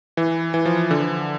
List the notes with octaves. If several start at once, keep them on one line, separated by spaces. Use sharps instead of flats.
E3
E3
F3
D3